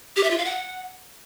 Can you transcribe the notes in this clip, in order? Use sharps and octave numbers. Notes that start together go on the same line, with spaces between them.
G4
E5
F4
F5
F#5